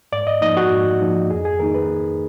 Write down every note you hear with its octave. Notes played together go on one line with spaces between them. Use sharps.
G#2 D5
D#5
F3 A#3 D#4 D#5
F#4
G#2
F3 A#3 D#4
F2 G#4
G#4
D#3 A#3 D#4 A#4
B4
F2